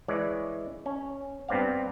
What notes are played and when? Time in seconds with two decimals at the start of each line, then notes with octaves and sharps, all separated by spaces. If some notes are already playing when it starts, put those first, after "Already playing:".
0.08 E3 G#3 C#5 D5
0.86 C#4
1.49 G2 B3 C4 D5 F5